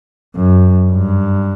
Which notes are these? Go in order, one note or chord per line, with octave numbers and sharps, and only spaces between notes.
F#2
G2